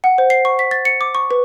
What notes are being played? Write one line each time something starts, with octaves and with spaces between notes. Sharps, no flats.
F#5
C5
C7
C#6
B6
A6
C#7
D6
C#6
B4